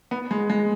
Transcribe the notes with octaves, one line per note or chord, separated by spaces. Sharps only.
B3
G#3
G#3